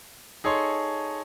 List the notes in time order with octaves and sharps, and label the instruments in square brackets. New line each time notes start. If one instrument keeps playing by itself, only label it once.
[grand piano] D#4 G#4 A4 C#5 C6